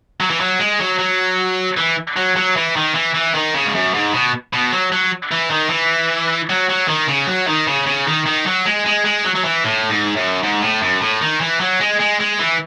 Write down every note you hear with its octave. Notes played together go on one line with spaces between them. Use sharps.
F#3
E3
F#3
G#3
F#3
F#3
E3
F#3
F#3
E3
D#3
E3
E3
D#3
C#3
G#2
F#2
G#2
B2
B2
F#3
F#3
E3
D#3
E3
F#3
F#3
D#3
C#3
F#3
D#3
C#3
C#3
D#3
D#3
F#3
G#3
G#3
G#3
F#3
F#3
E3
A2
G#2
F#2
G#2
A2
F#2
A2
D#3
E3
F#3
G#3
G#3
G#3
E3